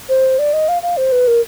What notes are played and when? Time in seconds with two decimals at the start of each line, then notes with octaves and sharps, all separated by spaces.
0.09 C5
0.39 D5
0.53 D#5
0.68 F5
0.83 F5
0.97 C5
1.12 B4
1.28 A#4